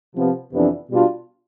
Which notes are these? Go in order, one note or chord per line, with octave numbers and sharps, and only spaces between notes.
C3 F3 B3
F2 C3 E3 B3 D4
B2 G3 D4 F4